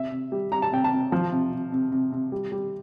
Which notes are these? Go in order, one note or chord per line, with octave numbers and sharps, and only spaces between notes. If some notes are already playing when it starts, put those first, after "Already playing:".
Already playing: C3 E5
C3
G3
G3 A#5
A5
C3 G5
A5
C3
F3
C3
C3
C3
C3
C3
G3
G3